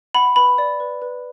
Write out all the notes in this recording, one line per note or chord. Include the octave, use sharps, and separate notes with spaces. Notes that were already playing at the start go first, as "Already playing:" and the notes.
F#5 B5
B4 B5
D5
B4
B4